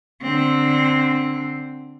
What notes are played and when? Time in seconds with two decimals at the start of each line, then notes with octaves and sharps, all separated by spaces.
0.22 D3 C4